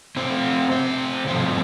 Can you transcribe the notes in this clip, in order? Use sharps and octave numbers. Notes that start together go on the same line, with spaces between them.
C3 A3 C4 C5
C5
G2 F3 A3 C4 C5